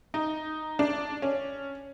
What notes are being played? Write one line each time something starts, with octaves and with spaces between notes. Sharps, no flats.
D#4
D4
C#4